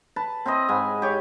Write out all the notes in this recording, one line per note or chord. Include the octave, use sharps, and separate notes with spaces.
B4 A5
C4 E4 B4 D#5
G#2 G#5 B5
G4 C#5